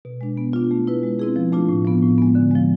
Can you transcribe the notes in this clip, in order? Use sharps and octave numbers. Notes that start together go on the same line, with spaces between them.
B2
G#3 D4
B3
D4 F4
A3
E4 B4
G#3
C4 E4 G#4
F3
A3 D4 F4
A2
F3 B3
A2
G#3 B3
D3
F3 G#3